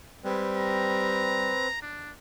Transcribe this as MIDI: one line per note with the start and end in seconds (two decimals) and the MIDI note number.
0.24 1.52 55
0.24 0.44 56
0.24 1.67 60
0.24 1.67 71
0.57 1.81 82
1.82 2.11 62